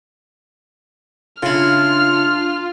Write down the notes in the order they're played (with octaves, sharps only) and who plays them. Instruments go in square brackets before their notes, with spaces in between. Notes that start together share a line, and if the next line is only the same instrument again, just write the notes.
[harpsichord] C#3 E4 [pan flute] D4 [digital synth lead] F4 [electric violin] F6